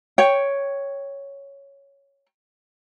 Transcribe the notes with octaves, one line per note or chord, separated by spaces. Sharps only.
C#5 G5